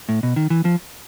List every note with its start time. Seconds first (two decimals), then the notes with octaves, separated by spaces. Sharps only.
0.09 A2
0.23 B2
0.36 D#3
0.50 E3
0.65 F3